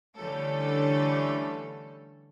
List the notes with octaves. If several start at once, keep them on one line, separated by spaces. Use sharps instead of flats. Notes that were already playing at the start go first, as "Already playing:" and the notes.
D3 E3 G3 A3 C#4 A4